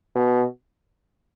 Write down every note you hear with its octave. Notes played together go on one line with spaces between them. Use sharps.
B2